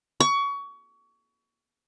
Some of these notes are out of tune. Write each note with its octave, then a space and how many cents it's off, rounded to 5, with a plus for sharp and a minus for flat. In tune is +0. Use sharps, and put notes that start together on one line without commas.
C#6 +25